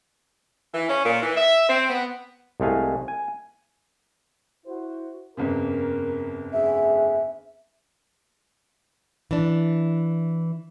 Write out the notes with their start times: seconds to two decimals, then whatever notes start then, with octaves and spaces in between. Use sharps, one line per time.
0.74 E3
0.89 C#4
1.05 A#2
1.22 E3
1.37 E5
1.69 C4
1.90 B3
2.60 C2 G#3 A3 F5 G#5
3.08 G#5
4.66 E4 F#4 C5
5.37 G1 F2 C#3 A#4
6.53 D2 G#4 E5
9.31 E3 D4